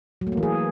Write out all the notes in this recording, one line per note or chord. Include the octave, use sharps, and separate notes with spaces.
F#3
A3
A#3
E3
G#4